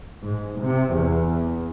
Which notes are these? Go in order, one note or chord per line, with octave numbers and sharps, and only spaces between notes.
G#2
C3
E2